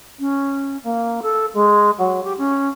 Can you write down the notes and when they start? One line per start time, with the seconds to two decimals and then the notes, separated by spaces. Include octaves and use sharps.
0.19 C#4
0.83 A#3
1.22 A4
1.54 G#3
1.98 F#3
2.23 G4
2.38 C#4